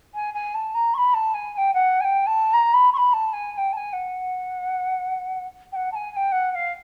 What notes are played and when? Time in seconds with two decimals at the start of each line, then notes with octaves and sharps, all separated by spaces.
0.14 G#5
0.34 G#5
0.54 A5
0.74 A#5
0.94 C#6
0.97 B5
1.14 A5
1.34 G#5
1.54 G#5
1.57 G5
1.74 F#5
2.00 G#5
2.04 G5
2.26 A5
2.53 A#5
2.73 B5
2.93 C#6
2.97 B5
3.13 A5
3.33 G#5
3.53 G#5
3.57 G5
3.72 A5
3.77 G#5
3.93 F#5
5.72 G5
5.75 F#5
5.92 A5
5.95 G#5
6.11 G#5
6.16 G5
6.32 F#5
6.51 F#5
6.55 F5